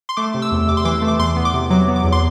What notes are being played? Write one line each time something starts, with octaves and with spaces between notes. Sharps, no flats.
C6
A3 D6
C3
E6
E2
C3 D6
C6
E3 D6
A3
D6
E2 C6
B3
D6
C3
F#3 D6
B3
D6
E2
C6